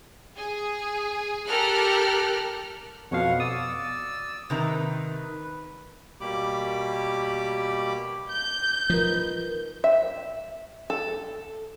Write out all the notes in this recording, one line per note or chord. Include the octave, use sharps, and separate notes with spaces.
G#4
G4 A4 A#4 F6 F#6
F2 B2 C#5 F5 F#5
D5 D#6 E6
C3 D#3 B4 A#5
B2 G3 A#3 G4 B5 D6
G6
F3 D#4 A#4 B4
E5
A4